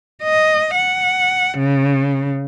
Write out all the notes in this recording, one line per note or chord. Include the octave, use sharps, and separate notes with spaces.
D#5
F#5
C#3